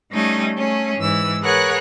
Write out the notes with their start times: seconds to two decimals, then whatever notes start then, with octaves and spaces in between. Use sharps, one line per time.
0.12 G3 A3 C#4 D#4 D#5
0.58 A3 C#4 G#4
0.98 G#2 E3 E6
1.43 G#4 A#4 B4 C#5 F#5 F#6